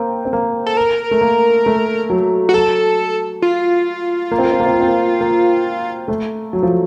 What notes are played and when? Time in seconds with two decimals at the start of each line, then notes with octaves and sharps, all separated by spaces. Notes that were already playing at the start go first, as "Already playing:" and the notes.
Already playing: A#3 C4
0.25 C4
0.33 A#3
0.66 A4
0.77 A#4
1.11 A3
1.21 A#3
1.66 A3
2.10 F#3
2.49 F#4
2.54 F#3 A4
3.42 F4
4.31 A#3
4.39 C4
4.45 A#3
4.52 C4
4.60 A#3
4.66 C4
4.74 A#3
4.81 C4
4.88 A#3
5.21 A#3
6.08 A3
6.53 F#3
6.63 F3